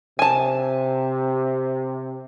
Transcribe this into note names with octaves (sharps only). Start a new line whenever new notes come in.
C3 G#5 A5